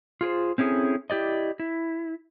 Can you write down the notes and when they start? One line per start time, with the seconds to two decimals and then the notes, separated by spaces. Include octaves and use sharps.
0.21 F4 G#4 A#4 C5
0.58 C4 C#4 E4 G#4 A4
1.10 E4 G4 D5 D#5
1.59 E4